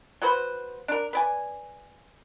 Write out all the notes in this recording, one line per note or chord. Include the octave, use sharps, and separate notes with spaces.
F#3 F#4 B4 C5
D4 A#4
B4 D5 G#5